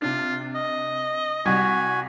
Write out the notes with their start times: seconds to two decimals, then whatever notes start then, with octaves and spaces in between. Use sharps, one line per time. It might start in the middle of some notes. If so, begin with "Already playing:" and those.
0.02 C3 D4 F4
0.55 D#5
1.45 C2 G3 F#4 G#5 G#6